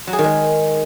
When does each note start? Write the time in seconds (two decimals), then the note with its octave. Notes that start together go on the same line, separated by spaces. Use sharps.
0.07 F#3
0.13 G#4
0.19 D#3
0.24 G#3